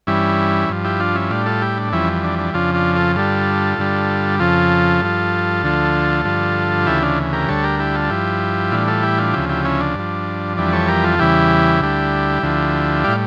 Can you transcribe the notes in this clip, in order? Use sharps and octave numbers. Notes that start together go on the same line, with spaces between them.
G2 E3 G3 C#4 E4
G2 F3
E4 G4
D4 F4
C#4 E4
A2 G3 D4 F4
F4 A4
E4 G4
D4
F2 E3 G3 C#4 E4
D4
D4
F2 C#3 F3 D4 F4
D4 F4
F4 A4
G2 D3 G3 F4 A4
G2 D3 G3
F2 C#3 F3 F4 A4
G2 F3
D2 D3 F3
G2 D3 F3
D2 C#3 E3 E4 G4
D4 F4
G4 A#4
D2 D3 G3 A4 C#5
G4 A#4
E4 G4
F4 A4
G2 F3 E4 G4
A2 E3 G3 D4 F4
F4 A4
E4 G4
D4 F4
D2 C#3 F3 E4 G4
E4 G4
C#4 E4
D4
G2 F3
F2 E3 G3 D4
A4 C#5
G4 A#4
F4 A4
E2 C#3 E3 G3 E4 G4
D2 D3 G3
D2 D3 F3
A2 G3 D5 F5